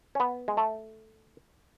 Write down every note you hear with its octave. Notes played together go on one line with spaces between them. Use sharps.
C#4
B3
G#3
A3